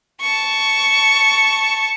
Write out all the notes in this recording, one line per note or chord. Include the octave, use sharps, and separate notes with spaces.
A5 C#6